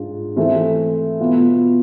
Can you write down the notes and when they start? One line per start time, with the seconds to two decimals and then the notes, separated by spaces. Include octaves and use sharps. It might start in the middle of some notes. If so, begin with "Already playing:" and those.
Already playing: G#2 G#3 D4 F4
0.36 E3 A3 C4
1.20 B2 B3 F4